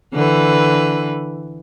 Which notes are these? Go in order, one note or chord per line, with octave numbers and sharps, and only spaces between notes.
D3 E3 B4